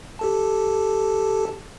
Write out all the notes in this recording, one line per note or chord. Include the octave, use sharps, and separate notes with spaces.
G4 A4 A5